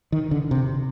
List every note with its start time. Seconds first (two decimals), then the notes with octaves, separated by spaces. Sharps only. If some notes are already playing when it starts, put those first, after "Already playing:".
0.12 D#3
0.31 D3
0.51 C3